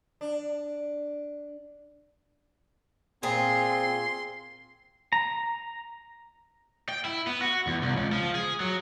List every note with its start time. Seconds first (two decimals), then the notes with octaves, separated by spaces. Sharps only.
0.21 D4
3.23 A#2 C4 F4 G#4 C6
5.13 A#5
6.89 G5
7.05 E4
7.27 B3
7.42 F#4
7.67 E2
7.82 C2
7.96 C#2
8.12 F3
8.35 G#4
8.60 F#3